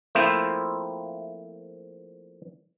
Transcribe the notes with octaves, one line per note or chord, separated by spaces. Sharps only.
F3 A3 A#3 C4 E4 F4